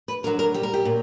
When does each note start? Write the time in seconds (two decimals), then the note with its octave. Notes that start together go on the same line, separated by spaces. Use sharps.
0.08 B4
0.23 D2 D3 F#3 A#4
0.39 A#4
0.54 A#2 G3 G4
0.63 A#4
0.73 G4
0.85 A#2 F#3